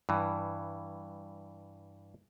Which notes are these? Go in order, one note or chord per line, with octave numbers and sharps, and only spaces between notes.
G2 E3